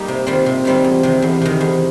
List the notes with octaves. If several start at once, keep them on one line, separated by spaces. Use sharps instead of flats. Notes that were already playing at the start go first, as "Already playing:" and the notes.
Already playing: G3 A#3 D#4 G4
C3
D#3 G3 C4 F4
C3
D#3 G3 C4 F4
E2
C3 D#3
E2
C3 D#3
E2